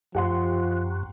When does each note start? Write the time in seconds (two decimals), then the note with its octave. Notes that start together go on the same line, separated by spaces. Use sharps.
0.15 F#2 F3 G4 F#5 C6